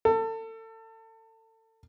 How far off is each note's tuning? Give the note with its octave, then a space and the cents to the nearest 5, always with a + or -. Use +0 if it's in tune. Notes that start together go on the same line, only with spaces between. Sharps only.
A4 +30